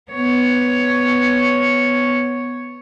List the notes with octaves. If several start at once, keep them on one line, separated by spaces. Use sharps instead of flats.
B3 C#5